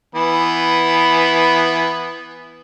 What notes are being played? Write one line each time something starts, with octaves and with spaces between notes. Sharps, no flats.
E3 B3